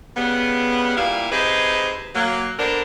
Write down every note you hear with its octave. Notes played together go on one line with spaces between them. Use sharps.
C#3 G3 B3
A#2 G3 E4 F5
C3 D#4 G#4 B4 C5
F#3 A#3
D3 B3 D4 A#4 C5